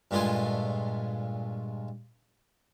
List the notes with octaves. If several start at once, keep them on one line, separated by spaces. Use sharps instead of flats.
G2 A#2 G#3 A3 F4 G#5